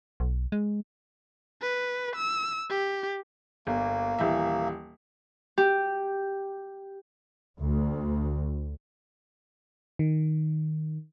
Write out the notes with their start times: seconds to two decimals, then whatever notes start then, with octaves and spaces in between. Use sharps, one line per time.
0.20 B1
0.52 G#3
1.62 B4
2.16 E6
2.70 G4
3.67 G1 A#3
4.19 D#1 E3 E5
5.58 G4
7.60 D2
9.99 D#3